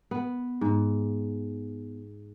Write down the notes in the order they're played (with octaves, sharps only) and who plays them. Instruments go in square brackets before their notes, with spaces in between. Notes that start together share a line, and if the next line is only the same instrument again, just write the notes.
[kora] B3
G#2